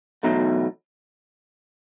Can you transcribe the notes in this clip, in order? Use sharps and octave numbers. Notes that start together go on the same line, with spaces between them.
E2 B2 F#3 A3 D#4